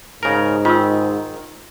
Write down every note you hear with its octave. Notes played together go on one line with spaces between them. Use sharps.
G#2 C#3 A#4
D#3 F4 E6